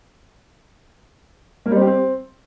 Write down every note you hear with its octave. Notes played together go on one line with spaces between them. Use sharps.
A#3
G3
C4
G4
C4